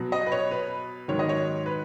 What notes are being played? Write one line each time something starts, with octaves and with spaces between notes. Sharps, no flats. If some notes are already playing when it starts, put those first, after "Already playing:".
Already playing: B2 F#3
D#5
B4
C#5
B4
G#2 D#3 F#3 C#5
D#5
C#5
B4